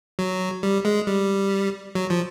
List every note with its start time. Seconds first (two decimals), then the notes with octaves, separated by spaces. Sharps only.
0.19 F#3
0.63 G3
0.85 G#3
1.07 G3
1.95 F#3
2.10 F3